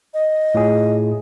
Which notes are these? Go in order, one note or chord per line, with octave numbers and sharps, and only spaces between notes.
D#5
A2 F4 G#4